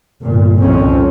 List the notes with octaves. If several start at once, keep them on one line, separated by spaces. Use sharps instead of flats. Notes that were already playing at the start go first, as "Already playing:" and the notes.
G1 A#2
C2 F2 D#3 C4 C#4